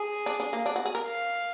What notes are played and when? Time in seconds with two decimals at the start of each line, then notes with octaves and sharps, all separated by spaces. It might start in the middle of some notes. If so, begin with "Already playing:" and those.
Already playing: G#4
0.26 D4
0.40 D4
0.53 A#3
0.66 D4
0.76 F#4
0.86 G#4
0.95 A#4
1.05 F5